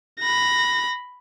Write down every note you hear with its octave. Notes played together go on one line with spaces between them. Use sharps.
B5 A#6